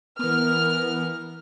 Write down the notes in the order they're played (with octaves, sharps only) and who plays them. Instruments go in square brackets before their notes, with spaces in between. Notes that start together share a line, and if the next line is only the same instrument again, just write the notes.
[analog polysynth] E3 B3 [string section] A#4 F6